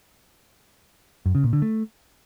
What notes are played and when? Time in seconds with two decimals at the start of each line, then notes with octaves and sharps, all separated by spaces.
1.26 F#2
1.35 C#3
1.44 A#2
1.53 D3
1.62 A3